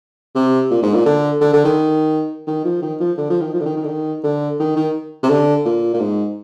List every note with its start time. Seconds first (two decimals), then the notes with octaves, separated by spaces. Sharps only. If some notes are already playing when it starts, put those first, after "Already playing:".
0.35 C3
0.71 A#2
0.83 G#2
0.94 A#2
1.06 D3
1.41 D3
1.54 D3
1.65 D#3
2.47 D#3
2.65 F3
2.82 D#3
3.00 F3
3.18 D3
3.30 F3
3.41 D#3
3.54 F3
3.60 D3
3.66 D#3
3.77 D#3
3.84 D3
3.88 D#3
4.24 D3
4.60 D#3
4.76 D#3
5.23 C3
5.30 D3
5.65 A#2
5.94 A#2
6.00 G#2